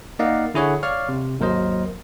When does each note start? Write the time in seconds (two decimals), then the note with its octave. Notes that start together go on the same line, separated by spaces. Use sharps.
0.19 A#3 D#4 D5 D#5 F5 F#5
0.54 D3 E4 G#4 C#5 F#5
0.83 C#5 D5 F5 C#6 F6
1.09 C3
1.39 G#1 D#2 F#3 A#4 C5 D#5